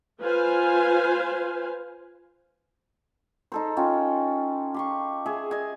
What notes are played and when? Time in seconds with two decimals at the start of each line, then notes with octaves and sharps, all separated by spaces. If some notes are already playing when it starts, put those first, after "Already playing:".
0.21 F4 B4 C5 F5 G#5
3.52 D#4 A4 C5
3.77 C#4 F4 G5
4.74 G4 C6 C#6
5.26 G#4 E5
5.51 D#5 G#5